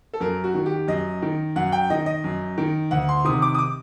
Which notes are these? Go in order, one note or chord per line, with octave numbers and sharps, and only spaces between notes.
A4
F#2 A#4
F#4
D#3
G4
F#2 D#5
D#3
F#2 F#5
G5
D#3 D#5
D#5
F#2
D#3
D2 F#5
C6
C3 D#3 D#6
D6
D#6
D6